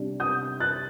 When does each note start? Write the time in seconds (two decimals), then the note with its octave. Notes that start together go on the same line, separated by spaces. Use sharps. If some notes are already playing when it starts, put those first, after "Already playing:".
Already playing: C3 G3 D4
0.20 D#6 G6
0.60 F#6 A6